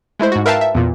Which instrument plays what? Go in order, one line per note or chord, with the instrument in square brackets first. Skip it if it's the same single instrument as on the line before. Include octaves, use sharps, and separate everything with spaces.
[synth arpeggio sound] G#3 A3 E4 C5
G#2 F#4
A#4 B4 E5 F5 G5 A5
E5
E2 A#2